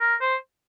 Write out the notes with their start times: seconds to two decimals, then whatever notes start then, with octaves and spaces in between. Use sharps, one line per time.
0.01 A#4
0.21 C5